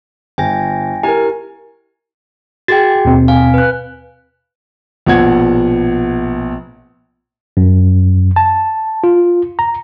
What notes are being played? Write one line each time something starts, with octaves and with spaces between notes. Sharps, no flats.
G1 G5 G#5 A#6
E4 G4 A#4 G#5
F#4 G#4 G5 A6
D#2 B2 C4
F5 G#5
B4 F#6
A#1 B2 F#5 G#6
F#2
A5
F4
A#5